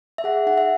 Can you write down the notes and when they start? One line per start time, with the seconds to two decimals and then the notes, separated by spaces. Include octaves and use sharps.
0.18 E5
0.24 G#4 F#5
0.46 D#4 F#5
0.58 E5